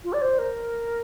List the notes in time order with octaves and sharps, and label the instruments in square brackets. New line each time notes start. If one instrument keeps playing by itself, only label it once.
[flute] F4
D5
C5
A#4